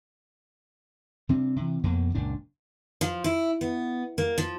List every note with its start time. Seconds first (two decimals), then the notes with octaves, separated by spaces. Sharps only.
1.29 C3 G3 C4 D4
1.56 C3 E3
1.84 F2 B2 A#3
2.15 F#1 C#2 A#2 D4
3.01 F3
3.24 E4
3.61 B3
4.18 A#3
4.38 F3